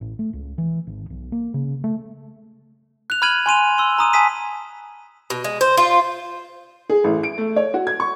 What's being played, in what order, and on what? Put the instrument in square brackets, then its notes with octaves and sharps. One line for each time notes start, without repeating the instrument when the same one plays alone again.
[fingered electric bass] A1
A3
C#2
E3
G#1
B1
A#3
C#3
A3
[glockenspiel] F#6 F7
B5 F6 G#6 D#7 F#7
G#5 C6 D#7 F7
C6 E6
A#5 D#6 D#7
G#5 A5 D#6 B6 D#7
[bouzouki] B2
G#3
C5
F4
[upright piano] G#4
A1
D7
A3
C#5
F#4
G#6
C#6